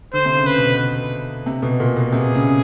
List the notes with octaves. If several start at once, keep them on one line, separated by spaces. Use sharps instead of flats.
D3 C5
C3
C#3
B4
B2
C3
B2
A#2
B2
C3 G#4
C#3